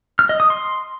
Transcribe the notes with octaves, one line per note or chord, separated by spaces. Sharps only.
F6
D#5
D#6
C6